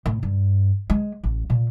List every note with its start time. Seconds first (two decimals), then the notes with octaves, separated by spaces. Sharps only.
0.06 A2
0.23 G2
0.90 G#3
1.24 A1
1.50 A#2